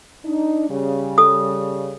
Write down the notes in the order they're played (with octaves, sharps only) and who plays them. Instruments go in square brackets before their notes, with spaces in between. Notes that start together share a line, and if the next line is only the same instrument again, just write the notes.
[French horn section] D4 D#4
C#3 G3
[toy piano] A4 D#6